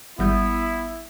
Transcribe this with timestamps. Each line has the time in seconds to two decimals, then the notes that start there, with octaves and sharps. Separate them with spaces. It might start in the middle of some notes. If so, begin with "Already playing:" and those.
0.19 G#1 G3 B3 E4 G6